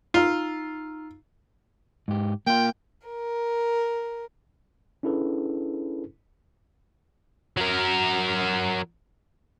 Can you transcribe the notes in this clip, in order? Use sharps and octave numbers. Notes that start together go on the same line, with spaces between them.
D#4 F4 A#5 E6
G#2 G4
A#3 F4 G5
A#4
C#4 D4 E4 G#4 A4 B4
F#3 A#4